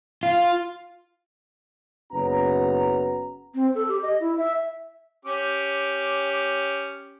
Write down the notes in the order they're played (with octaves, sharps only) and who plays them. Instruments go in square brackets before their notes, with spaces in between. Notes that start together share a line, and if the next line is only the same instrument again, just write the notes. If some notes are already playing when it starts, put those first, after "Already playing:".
[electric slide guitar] F4
[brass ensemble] F#1 B3 C#4 F#4 A#5
[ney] C4
A4
G4
D#5
E4
E5
[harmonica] C#4 G4 D6